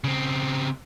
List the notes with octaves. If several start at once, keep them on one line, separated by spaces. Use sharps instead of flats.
C#3 C4